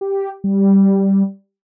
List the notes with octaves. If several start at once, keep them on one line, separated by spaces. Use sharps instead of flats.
G4
G3